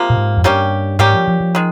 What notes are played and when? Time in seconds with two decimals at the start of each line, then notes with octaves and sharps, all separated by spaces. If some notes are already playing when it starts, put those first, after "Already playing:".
Already playing: C3 F3 A#3
0.10 A#2
0.17 G#2
0.37 F2
0.44 G2 G3 A#3 C#4 G4
0.99 G#2 G3 A#3 C#4 G4
1.13 F3
1.28 F3
1.40 F3
1.55 D#3 G#3